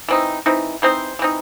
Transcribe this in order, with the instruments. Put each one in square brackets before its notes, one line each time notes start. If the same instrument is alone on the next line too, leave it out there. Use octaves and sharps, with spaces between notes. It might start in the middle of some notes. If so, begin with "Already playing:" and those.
[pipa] E3 C4 D#4
E3 C4 D#4
E3 C4 D#4 C5
E3 C4 D#4